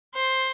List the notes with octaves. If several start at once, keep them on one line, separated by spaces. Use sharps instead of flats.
C5